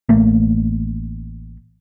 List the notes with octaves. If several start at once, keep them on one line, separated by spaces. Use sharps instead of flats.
A1 A3 A#3